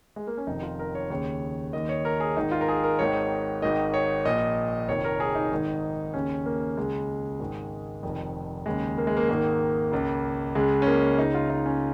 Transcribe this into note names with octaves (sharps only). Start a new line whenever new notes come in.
G#3
A#3
C#4
F1 F2 D#3 D#4
F4
A#4
C#5
D#2 C#3 C#5
D#2 D#3 D#5
C#5
A#4
G#4
G#1 G#2 D#3 D#4
F4
A#4
G#4
A#4
G#1 G#2 D#3 C#5
G#1 G#2 D#3 D#5
C#5
A#1 A#2 D#5
F1 F2 D#3 C#5
A#4
G#4
D#4
G#1 G#2 D#3
D#2 C#3 C#4
A#3
C#2 C#3 G#3
G#1 G#2 D#3
F1 F2 D#3
D#2 C#3 G#3
A#3
G#3
A#3
G#1 G#2 D#3 A#3
C#2 C#3
C#2 C#3 G#3
C#4
A#3
C#2 C#3 D#4
F4
D#4
C#4